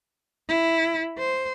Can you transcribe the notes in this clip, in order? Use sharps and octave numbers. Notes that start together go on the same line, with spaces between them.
E4
C5